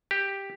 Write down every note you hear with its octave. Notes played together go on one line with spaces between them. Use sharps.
G4